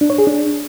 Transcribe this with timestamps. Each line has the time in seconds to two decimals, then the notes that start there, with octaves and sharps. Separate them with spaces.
0.01 D4
0.10 C#5
0.18 G#4
0.27 D4